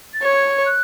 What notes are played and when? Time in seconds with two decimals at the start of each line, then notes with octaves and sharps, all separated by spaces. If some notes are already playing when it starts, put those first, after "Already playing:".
0.14 A6
0.24 C#5 G#6
0.66 F#6